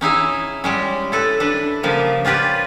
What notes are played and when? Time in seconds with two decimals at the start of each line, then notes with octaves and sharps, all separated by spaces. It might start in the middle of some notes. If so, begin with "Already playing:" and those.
0.01 C#4 D#4 E4 G#4
0.64 G3 G#3 C#4
1.12 E4 A4 B4
1.40 D4 B4
1.83 C#3 F3 G3 A#3
2.25 C#4 F4 G4 B4 D5